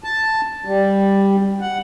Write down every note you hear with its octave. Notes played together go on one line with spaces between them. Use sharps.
A5
G3
F#5